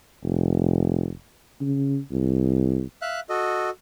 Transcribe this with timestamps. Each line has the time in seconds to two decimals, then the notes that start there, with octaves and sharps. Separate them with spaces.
0.23 F1
1.61 C#3
2.11 C2
3.02 E5 F5 F#6
3.29 F#4 A4 D#5